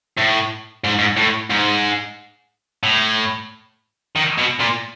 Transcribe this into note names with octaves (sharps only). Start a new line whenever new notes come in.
A2
G#2
G#2
A2
G#2
A2
D#3
B2
A#2